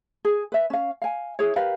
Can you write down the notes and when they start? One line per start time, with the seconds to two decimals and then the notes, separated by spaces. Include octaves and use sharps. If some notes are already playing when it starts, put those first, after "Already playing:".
0.25 G#4
0.52 B4 E5
0.70 C#4 F5
1.02 F5 G#5
1.39 E4 G#4 C#5
1.56 G4 A#4 B4 F5